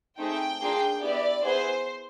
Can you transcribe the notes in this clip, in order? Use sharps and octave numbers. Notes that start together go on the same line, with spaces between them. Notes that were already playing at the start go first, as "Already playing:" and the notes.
A3 C4 D#4 G#4 G5
A#3 D4 F4 G#4
B3 E4 G4 D5
B3 E4 G#4 C5